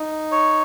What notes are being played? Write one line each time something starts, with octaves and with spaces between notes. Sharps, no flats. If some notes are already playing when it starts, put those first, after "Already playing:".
Already playing: D#4
C#5